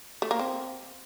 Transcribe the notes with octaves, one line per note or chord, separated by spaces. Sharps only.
A3
A#3
C4